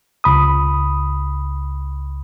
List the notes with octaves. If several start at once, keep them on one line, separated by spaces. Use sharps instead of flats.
C#2 B5 D#6